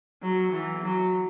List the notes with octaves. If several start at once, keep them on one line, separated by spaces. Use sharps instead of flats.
F#3
E3
F#3